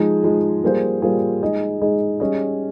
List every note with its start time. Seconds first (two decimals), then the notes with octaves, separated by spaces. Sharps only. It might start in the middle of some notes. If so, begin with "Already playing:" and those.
Already playing: F3 G#3 D#4 G#4
0.24 F3 G#3 D#4 G#4
0.63 G3 A#3 F4 G#4 C5
1.02 G3 A#3 F4 G#4 C5
1.42 G#3 D#4 G#4 D#5
1.81 G#3 D#4 G#4 D#5
2.20 G3 C#4 G#4 D#5